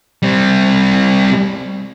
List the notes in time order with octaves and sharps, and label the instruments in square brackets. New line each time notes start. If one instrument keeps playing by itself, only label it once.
[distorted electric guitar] G3 C4